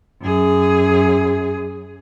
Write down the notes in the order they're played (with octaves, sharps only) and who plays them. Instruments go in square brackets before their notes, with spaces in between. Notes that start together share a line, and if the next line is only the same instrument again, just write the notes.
[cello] F#2 G#4